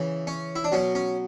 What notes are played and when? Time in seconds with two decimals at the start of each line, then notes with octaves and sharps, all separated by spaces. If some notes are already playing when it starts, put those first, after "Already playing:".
Already playing: C#3 E3
0.27 C#4
0.56 E4
0.64 D4
0.72 B2 F#3 C#4
0.95 C#4